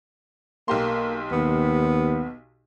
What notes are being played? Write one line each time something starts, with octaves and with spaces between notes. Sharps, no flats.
B1 A#3 G4 C6
D#2 B3